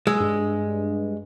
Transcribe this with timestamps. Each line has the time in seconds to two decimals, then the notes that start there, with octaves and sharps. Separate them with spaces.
0.07 G#3 E6
0.20 G2